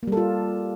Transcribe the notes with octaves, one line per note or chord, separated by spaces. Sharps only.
G3 A#3 F4 A4